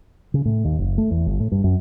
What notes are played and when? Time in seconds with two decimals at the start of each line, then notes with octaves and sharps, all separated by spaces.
0.34 C#3
0.45 A2
0.65 D#2
0.78 F#1
0.98 A3
1.11 E2
1.26 G1
1.40 A2
1.52 G2
1.64 F#2